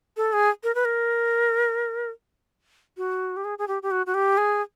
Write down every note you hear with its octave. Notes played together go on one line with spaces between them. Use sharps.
A4
G#4
A#4
B4
A#4
F#4
G4
G#4
G#4
G4
G4
F#4
F#4
G4
G#4